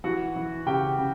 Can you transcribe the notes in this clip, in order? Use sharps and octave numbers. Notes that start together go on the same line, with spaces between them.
E3 F#4 F#5
E3
C#3 G4 G5
C#3